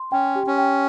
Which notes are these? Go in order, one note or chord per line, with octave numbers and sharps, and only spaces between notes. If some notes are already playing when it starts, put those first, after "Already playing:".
Already playing: C6
C#4 G5
G4
C#4
G5